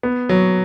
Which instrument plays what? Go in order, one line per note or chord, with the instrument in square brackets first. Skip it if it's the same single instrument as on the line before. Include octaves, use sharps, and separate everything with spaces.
[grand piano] B3
F#3